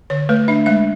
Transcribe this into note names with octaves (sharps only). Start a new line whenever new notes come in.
D3 C#5
A3 B4
D4 E5
G#3 E5